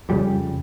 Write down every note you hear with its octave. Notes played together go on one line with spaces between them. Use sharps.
F2 C#3 G3